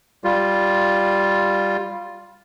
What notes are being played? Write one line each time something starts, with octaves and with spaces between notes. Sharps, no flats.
G3 F4